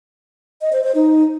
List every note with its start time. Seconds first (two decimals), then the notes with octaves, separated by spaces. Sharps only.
0.61 D#5
0.73 C5
0.84 C5
0.95 D#4